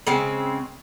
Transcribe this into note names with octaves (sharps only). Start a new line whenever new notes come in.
C#3 G#3 C4